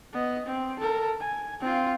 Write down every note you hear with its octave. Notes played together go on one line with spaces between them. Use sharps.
B3 D#5
C4
A4 A#4
G#5
C4 F4